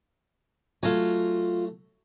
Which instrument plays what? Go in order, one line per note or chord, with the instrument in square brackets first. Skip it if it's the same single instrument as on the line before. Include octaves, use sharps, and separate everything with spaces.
[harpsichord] F#3 A3 A4 [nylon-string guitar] F4 G#5